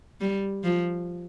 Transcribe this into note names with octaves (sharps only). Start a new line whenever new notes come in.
G3
F3